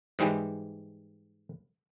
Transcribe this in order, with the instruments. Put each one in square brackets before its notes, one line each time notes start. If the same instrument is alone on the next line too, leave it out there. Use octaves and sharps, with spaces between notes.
[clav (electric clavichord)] G#2 E3 G3 G#3